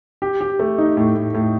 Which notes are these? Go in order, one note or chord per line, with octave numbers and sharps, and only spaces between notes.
G4
G4
A3
D#4
A2
A2
A2